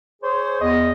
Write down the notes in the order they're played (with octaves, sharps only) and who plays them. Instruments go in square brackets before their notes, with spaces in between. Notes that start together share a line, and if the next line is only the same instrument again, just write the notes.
[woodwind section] G#4 C5 C#5
[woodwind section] E2 [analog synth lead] D#5